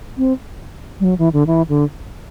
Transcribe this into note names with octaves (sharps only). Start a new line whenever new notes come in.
C4
G3
F#3
E3
D3
E3
D3